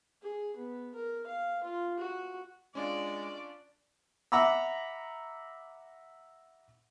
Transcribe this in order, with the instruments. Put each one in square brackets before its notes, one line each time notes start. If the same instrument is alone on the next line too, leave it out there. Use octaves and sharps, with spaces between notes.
[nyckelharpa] G#4
B3
A#4
F5
F4
F#4
[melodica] G#3 [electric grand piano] C#4 D4 F4 [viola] D5
[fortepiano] E5 F#5 A#5 B5 D6 E6